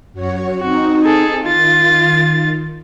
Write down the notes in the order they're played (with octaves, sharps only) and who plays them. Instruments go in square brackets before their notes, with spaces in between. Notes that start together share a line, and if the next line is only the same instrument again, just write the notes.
[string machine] F#2 F#4 C#5
[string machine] C4 D#4 [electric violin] F#4
[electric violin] G#4 A4
[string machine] D#3 [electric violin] F4 A6